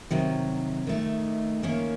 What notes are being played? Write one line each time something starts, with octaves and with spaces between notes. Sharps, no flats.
C3 D#3 F#3
D#3 A3 D#4
D#3 A#3 C#4